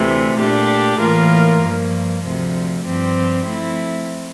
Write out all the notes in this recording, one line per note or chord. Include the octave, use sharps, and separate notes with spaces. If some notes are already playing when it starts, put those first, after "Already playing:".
Already playing: D2 C3 E3 A3
A#2 A3 D4 G4
A2 E3 A#3 F4 A#4
G2 F3 A#3
D2 C3 F3
G2 F3 C4 G4
F3 A3 C4 E4